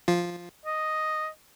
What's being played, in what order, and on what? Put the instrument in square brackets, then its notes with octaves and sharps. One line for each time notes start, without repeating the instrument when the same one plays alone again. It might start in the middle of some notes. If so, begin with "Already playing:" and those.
[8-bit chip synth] F3 F4
[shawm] D#5